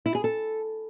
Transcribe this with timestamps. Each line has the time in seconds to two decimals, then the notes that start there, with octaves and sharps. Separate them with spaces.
0.06 E4
0.15 G#4
0.24 A4